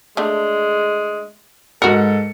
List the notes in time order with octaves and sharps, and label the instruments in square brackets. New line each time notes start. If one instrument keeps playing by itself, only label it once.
[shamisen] D3 A3 [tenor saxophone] G#3
[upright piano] G#2 C#7 [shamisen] F#4 A#4 [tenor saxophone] A4